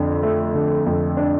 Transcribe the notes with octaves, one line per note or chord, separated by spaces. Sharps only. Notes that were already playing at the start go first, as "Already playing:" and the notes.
Already playing: F2 D3 D4
A3
D3
F2
D4